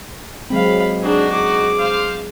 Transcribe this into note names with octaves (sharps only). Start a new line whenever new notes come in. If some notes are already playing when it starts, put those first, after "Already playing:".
F#3 G#3 C4 F5 B5
D4 D#4 F#4 G#4
G#4 D6
C5 F5